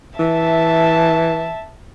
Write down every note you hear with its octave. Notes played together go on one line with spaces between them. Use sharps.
E3 E5 A5